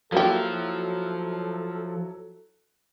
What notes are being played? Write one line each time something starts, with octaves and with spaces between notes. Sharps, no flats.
F3 F#3 A#3 E4 F#4 G4 A4